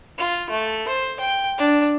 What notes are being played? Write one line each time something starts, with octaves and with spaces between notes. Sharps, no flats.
F4
A3
C5
G5
D4